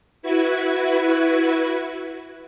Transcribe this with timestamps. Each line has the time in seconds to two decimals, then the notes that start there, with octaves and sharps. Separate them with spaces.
0.22 E4 F#4 B4 G#6